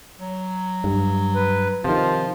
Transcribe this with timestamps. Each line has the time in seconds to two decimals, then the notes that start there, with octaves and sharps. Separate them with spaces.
0.20 F#3
0.84 G2
1.35 B4
1.84 C3 D#3 F3 F4